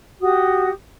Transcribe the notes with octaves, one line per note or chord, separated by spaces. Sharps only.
F#4 G4 D#6